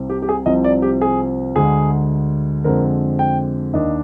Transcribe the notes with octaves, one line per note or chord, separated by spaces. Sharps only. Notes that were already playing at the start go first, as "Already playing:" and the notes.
Already playing: C2 C3 G3 C4
G4
G4
G#4
C2 C3 F3 C4 D#5
D5
G4
G#4
D2 D3 G#3 G#4
F2 D3 G#3 C4 A#4
G5
D#2 D#3 A#3 D4 D#5